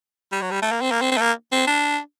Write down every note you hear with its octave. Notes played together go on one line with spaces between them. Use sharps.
G3
F#3
G3
A3
A#3
C4
A#3
C4
C4
A3
A#3
C4
D4